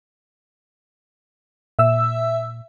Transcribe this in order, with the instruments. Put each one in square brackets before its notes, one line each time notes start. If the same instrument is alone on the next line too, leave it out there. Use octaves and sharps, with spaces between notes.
[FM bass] A#2 [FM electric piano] E5 E6